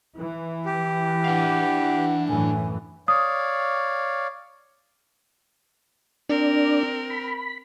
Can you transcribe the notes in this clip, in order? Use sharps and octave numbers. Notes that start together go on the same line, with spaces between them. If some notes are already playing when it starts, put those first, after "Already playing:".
E3
G4
D4 F5 F#5
F#2 A2 E3 G#5
C#5 D5 F5 D#6
C4 D4 A#4
B5